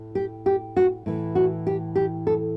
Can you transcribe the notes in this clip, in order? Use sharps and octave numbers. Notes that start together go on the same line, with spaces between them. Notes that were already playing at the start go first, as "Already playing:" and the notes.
Already playing: A2
G4
G4
F#4
A2 E3
F#4
G4
G4
A4